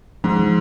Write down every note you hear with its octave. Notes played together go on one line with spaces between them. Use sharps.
G#2 F3
F3